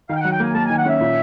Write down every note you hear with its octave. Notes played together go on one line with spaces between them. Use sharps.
D#3 F5
G5
F#3 F#5
G5
A#3 G#5
A#3 A5
D#3 G#5
F#5
C#4 E5
A#2